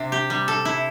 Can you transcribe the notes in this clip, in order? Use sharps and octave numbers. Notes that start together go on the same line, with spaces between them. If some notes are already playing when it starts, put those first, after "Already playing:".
Already playing: C3 D4
G4
G3
A4
E4